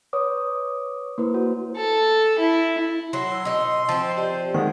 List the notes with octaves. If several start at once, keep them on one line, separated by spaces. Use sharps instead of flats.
B4 C#5 D6 D#6
A#3 E4 B4 C5
F#4
A4
E4
F#3 C6
E6
B2 D#4
F3 C4
G4 D5 D#5
D#3 G#3 G#4 F5 F#5